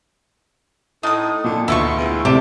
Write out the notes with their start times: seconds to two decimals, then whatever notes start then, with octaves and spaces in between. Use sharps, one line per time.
1.03 A2 D#4 D#6
1.44 A#2 D3
1.68 D2 B2 E4 F4 C#6
1.98 E2
2.25 C3 G4 A4 D5